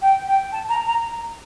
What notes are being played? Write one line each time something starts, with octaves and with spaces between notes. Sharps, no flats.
G5
G5
A5
A#5
A#5